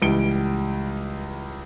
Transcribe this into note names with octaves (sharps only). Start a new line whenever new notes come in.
C#2 E3 G3 D7 G7